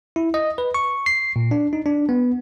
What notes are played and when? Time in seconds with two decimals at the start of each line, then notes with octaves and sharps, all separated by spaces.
0.16 E4
0.34 D#5
0.58 B4
0.74 C#6
1.06 C7
1.36 A#2
1.51 D4
1.73 D#4
1.86 D4
2.09 B3